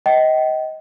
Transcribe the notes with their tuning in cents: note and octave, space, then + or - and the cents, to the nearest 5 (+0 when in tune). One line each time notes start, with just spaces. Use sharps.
D#5 +20 G5 -35